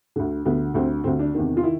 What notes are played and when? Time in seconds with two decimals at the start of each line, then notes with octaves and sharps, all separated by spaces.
0.16 D2 D3
0.45 D2 D3 B3
0.74 D2 D3 C4
1.04 D2 D3 C4
1.19 D4
1.35 E2 C3 D#3
1.57 F4
1.63 D#3 E4